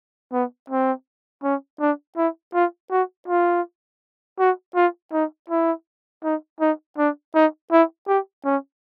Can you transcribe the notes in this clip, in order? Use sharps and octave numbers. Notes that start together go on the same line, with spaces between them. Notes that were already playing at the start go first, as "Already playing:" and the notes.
B3
C4
C#4
D4
E4
F4
F#4
F4
F#4
F4
D#4
E4
D#4
D#4
D4
D#4
E4
G4
C#4